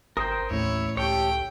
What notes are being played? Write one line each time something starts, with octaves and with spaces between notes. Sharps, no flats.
G#1 A#4 C5 G5 D#6
A1 D#2 A2 E4 C#5
C#2 G4 A4 C#5 G5